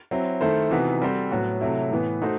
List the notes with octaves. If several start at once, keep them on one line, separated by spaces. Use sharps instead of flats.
F#3 C4 E4
D#3 A3 E4 A4 C5
C3 E3 B3 D#4 F#4
G3 C4 F#4 A4 C5
A2 F#3 B3 F#4
C3 F#3 A3 E4
A2 E3 B3
A3 D#4 F#4 C5